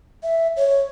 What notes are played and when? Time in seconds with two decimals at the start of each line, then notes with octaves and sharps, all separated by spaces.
0.23 E5
0.57 C#5